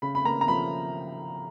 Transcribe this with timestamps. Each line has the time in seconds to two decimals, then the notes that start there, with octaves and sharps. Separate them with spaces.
0.02 C#3 B5
0.15 B5
0.25 A#3 A#5
0.41 A#5
0.48 F3 B5